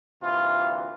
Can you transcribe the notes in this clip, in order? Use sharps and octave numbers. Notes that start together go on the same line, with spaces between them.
D2 C3 E3 A#3 F4